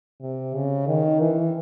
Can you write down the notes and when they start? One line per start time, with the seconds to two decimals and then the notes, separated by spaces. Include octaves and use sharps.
0.21 C3
0.54 C#3
0.87 D#3
1.20 E3